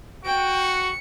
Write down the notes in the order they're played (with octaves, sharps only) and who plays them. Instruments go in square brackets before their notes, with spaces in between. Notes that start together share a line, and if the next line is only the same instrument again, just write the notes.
[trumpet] F#4 [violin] G5 D7
[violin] C#7